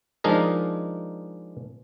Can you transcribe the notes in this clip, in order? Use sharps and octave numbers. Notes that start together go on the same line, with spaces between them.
F3 G#3 D4 D#4 G#4 A#4